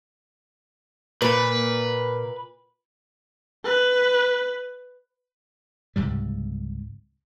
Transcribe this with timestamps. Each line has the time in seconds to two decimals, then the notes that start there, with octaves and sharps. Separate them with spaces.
1.22 A#2 B4
3.65 B4
5.96 C#2 G#2 C3 G3